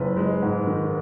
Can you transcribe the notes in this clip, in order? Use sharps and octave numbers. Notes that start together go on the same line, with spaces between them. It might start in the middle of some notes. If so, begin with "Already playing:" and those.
Already playing: F#1 B4
G#3
G#2
D#3